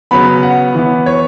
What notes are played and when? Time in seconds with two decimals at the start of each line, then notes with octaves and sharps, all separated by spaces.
0.11 C#3 F#3 B3 B5
0.43 F#5
0.75 E3 B3
1.06 C#5